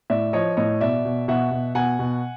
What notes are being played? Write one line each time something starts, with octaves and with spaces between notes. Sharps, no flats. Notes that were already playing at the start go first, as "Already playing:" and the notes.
A2 D5 E5
F3 C#5 D#5
A2 C#5 D#5
B2 D5 E5
B2
B2 E5 F#5
B2
B2 F#5 G#5
B2